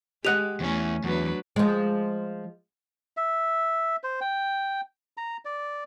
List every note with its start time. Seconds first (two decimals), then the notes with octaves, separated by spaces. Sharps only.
0.25 G#3 G4 D#5 F#5 F#6 F7
0.60 E2 E3 A3 C#4
1.04 E2 F#3 D4 B4
1.56 F3 G#3
3.17 E5
4.04 C5
4.21 G5
5.17 A#5
5.45 D5